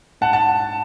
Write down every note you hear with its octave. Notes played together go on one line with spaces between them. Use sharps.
G#2 F#5 A5
F#5 A5